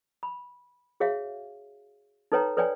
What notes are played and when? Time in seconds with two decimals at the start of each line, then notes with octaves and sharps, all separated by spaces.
0.23 B5
1.00 F#4 G#4 C#5 E5 F5
2.32 D#4 A4 B4 C#5 G5 A#5
2.57 A4 B4 C#5 D5 G5 G#5